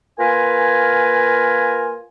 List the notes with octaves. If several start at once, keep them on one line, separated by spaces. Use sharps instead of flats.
A#3 F4 A#4 B4 G#5